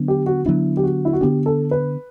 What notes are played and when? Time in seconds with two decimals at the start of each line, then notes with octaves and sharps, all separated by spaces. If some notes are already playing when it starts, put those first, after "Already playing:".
Already playing: D3 F#3 B3 D4
0.08 G4
0.26 F#4
0.46 D3 F#3 B3 D4 E4
0.77 G4
0.83 F#4
1.05 E4
1.13 F#4
1.21 D3 F#3 B3 D4 G4
1.46 A4
1.71 B4